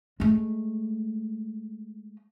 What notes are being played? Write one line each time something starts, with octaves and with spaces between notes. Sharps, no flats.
G#3 A3